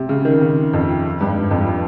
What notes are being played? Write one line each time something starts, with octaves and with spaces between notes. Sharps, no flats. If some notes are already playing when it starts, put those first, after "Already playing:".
Already playing: C3
C#3
D#3
C#3
F2
G2
G#2
F2
G2